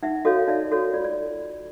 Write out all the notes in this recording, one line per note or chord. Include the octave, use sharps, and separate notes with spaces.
D#4 E5 F#5
F#4 A4 C#5 D#5 F5
F5
D#4 D5 E5
F#4 A4 C#5
F4 D5
D5